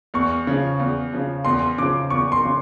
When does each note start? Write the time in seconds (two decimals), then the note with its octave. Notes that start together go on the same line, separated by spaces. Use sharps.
0.14 E2 C#6
0.47 C#3 F3
0.79 E2
1.13 C#3 F3
1.45 E2 C6
1.78 C#3 F3 D6
2.10 E2 C#6
2.32 C6
2.43 C#3 F3